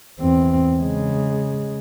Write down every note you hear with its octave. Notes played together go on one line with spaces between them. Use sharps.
E2 C4
C#3 G#3